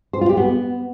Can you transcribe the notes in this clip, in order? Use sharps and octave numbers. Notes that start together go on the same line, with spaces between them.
C5
F4
G4
B3